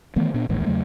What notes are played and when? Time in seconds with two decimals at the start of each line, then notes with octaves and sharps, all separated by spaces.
0.16 D#3 E3 A3 B3
0.34 A#2 B3 D4
0.49 D1 A1 D#2 G#2
0.67 E2 C#3 F#3 A3